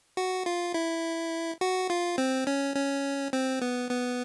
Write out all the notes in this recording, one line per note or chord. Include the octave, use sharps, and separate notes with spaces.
F#4
F4
E4
F#4
F4
C4
C#4
C#4
C4
B3
B3